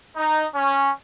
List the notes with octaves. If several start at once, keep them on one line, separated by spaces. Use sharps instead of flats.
D#4
C#4